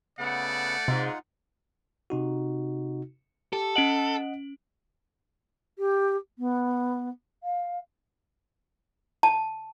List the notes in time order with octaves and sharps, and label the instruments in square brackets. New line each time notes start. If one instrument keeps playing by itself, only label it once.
[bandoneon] C#3 B3 [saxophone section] A3 F#5 [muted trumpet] D5
[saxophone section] G#2 [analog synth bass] C3 [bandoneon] D#4 F4 F#5
[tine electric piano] C3 D#4 F#4
[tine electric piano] G4 [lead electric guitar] A4
[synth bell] C#4 D7 F#7 [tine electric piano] D#5 F#5
[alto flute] G4
B3
F5
[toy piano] A5